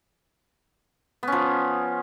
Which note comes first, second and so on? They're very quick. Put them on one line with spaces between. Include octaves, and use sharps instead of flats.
B3 C#4 F3